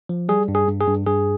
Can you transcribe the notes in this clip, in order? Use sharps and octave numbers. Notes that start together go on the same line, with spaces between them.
F3
G3 G#4
G2
G#4
G2
G#4
G2
G2 G#4